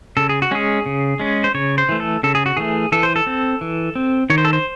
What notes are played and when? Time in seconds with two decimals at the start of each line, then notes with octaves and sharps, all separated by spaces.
0.17 C#3 A4
0.29 G#4
0.42 F#4
0.51 G#3 C#4 G#4
0.86 C#3
1.20 G#3 C#4
1.44 C5
1.55 C#3 C#5
1.78 C5
1.89 E3 A3
2.00 A4
2.23 C#3 A4
2.35 G#4
2.46 F#4
2.57 E3 A3 G#4
2.92 E3 A4
3.03 C5
3.16 A4
3.27 C4
3.61 E3
3.96 C4
4.30 D#3 C#5
4.38 C5
4.45 A4
4.53 C5